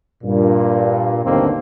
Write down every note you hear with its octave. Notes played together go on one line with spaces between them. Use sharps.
G2 A#2
A1 D#2 D3 D#3 A#3 C4